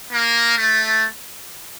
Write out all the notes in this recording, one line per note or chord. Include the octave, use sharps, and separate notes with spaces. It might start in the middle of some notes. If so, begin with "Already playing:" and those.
A#3
A3